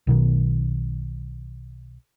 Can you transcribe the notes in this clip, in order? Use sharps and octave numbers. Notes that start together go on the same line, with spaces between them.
B1 B2 D#3